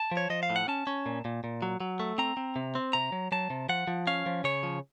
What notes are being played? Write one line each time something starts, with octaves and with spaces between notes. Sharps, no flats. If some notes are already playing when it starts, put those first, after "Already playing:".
Already playing: A5
F3
C#5
F3 D#5
F5
A2
F#5
C#4 A5
C#4
A#2
A#2
A#2
F#3
F#3
A3
C4 A#5
C4
C3
C4
C3 A#5
F#3
F#3 A5
C3
F3 F#5
F3
C#4 F5
F3
C#3 C#5
F3